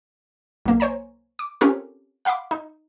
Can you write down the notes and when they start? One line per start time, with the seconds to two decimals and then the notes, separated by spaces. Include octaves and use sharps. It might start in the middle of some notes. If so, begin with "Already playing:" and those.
0.65 B1 A#3
0.80 C5 C#5 G#5 A#5
1.39 D6
1.61 C4 C#4 F4 G4 A4 A#4
2.25 F5 F#5 B5 C6 D6
2.51 D#4